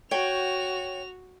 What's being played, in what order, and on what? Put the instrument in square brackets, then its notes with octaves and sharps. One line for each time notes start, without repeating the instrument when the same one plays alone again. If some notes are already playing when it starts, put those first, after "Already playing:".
[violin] F#4 F7 [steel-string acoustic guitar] C#5 F#5 G5